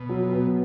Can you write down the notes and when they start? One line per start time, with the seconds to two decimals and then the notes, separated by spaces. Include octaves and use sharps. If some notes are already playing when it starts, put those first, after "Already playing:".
Already playing: B2
0.09 F#3
0.33 B3